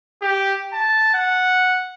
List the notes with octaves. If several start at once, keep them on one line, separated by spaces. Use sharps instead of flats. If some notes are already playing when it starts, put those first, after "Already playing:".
G4
A5
F#5